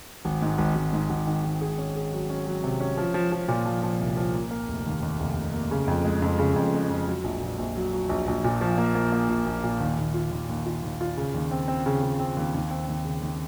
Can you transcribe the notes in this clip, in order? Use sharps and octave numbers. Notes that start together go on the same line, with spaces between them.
G#1
G#2
G#1
G#1
G#2
G#1
D#3
G#1
G#4
C#4
G#4
F#3
C#4
F#3
C3
C#4
F3
F3
F3
A#2
F3
F3
C2
F3
A#3
A#3
F1
D#2
D#2
F1
F1
A#3
C#3
F2
G#3
F2
C#3
F2
G#3
F2
F#3
A#1
A#2
A#1
F#3
F#3
A#1
A#1
A#2
F3
A#3
A#3
A#3
A#1
A#1
A#2
D#2
D#2
F4
D#2
D#2
F4
D#2
F4
C#3
D#2
C4
C4
C#3
C#3
C4
D#2
D#2
C4
D#2
C#3
D#2